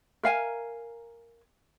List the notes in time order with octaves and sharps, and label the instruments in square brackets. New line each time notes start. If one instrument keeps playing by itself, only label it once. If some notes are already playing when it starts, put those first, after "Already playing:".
[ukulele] A#4 F5 G#5